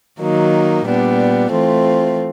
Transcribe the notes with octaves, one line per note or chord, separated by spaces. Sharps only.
D#3 F#3 A#3 D#4
A#2 G3 B3 D4
E3 A3 C4 F4